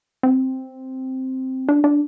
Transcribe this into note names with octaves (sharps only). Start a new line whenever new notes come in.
C4
D4
D4